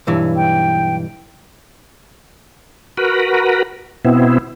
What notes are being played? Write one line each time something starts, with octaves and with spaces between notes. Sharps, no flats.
B1 G2 E3
G5
F#4 A#4 B4
B2 B3 C4 E4